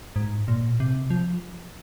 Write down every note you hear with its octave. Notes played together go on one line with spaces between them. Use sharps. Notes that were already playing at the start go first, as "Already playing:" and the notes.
G#2
A#2
C3
F3